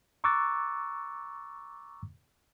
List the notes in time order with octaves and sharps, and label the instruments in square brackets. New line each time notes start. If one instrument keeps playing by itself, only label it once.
[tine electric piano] A#5 C#6 D6 E6 F#6 A6